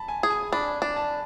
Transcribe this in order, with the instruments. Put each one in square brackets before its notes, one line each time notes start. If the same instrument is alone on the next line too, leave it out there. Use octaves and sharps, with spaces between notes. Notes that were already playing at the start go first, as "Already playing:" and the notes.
Already playing: [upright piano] A5 B5
G#5
[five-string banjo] G#4
[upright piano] G#5
[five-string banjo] D4 [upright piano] B5
[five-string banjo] D4
[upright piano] A5